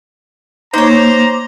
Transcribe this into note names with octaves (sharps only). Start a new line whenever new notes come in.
A#3 D#4 C5 C#5 A#5 D6